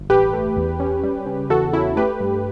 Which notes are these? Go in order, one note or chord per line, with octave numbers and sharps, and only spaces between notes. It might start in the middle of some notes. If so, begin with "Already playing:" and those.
Already playing: G1
A1 G4 B4
A3
E2
C#4
G3
C#3
E2 F#4 A4
C#4 E4
A3 G4 B4
G2